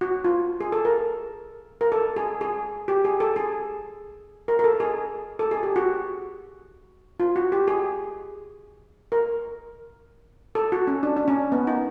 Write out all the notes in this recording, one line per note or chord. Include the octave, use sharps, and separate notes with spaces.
F#4
F4
G#4
A4
A#4
A#4
A4
G#4
G#4
G4
G#4
A4
G#4
A#4
A#4
A4
G#4
A4
G#4
G4
F#4
F4
F#4
G4
G#4
A#4
A4
F#4
C#4
D4
D4
C#4
B3
D#4